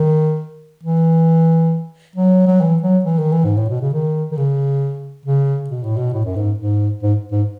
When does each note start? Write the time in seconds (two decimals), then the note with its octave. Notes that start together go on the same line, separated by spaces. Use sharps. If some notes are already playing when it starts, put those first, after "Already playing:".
Already playing: D#3
0.83 E3
2.16 F#3
2.47 F#3
2.61 E3
2.83 F#3
3.05 E3
3.18 D#3
3.32 E3
3.44 G#2
3.57 A2
3.69 B2
3.81 C#3
3.93 D#3
4.31 D#3
4.37 C#3
5.26 C#3
5.70 B2
5.83 A2
5.97 B2
6.13 A2
6.25 F#2
6.36 G#2
6.58 G#2
7.03 G#2
7.32 G#2